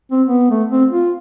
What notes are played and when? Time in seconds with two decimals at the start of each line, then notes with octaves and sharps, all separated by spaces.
0.12 C4
0.27 B3
0.50 A3
0.72 C4
0.91 F4